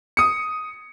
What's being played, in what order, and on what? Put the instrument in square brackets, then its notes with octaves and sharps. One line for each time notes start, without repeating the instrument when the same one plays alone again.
[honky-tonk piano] D#6 C#7